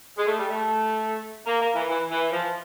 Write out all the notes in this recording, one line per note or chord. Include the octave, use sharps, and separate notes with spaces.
G#3
A3
G3
A3
A#3
A#3
E3
E3
E3
F3